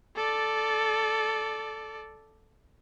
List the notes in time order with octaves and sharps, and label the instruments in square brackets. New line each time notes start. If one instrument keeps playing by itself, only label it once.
[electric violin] A4 D5